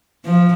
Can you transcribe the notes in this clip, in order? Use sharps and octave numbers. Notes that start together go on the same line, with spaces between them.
F3